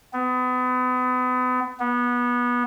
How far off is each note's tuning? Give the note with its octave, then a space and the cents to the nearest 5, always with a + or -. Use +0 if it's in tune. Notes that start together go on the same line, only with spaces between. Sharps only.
B3 +35
B3 -20